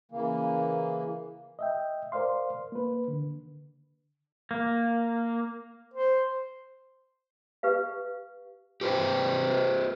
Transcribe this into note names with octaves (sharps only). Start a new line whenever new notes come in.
C#3 E3 A#3
D#5 E5 G5
A#4 C5 D5 F5 C6
A#3 B4
D3
A#3
C5
G4 B4 F5
G4 B4 C5 G5